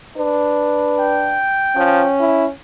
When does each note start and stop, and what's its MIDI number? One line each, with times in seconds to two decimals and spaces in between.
0.17 1.44 62
0.17 1.43 71
1.00 2.21 79
1.76 2.05 53
1.76 2.50 61
2.20 2.46 64